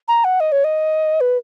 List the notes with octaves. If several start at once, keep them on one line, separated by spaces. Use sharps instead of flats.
A#5
F#5
D#5
C#5
D#5
B4